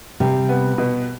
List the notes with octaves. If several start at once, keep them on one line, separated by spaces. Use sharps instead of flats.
C3 G3
B3
B2